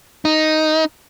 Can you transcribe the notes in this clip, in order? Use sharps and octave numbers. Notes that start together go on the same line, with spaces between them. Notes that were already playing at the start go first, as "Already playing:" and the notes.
D#4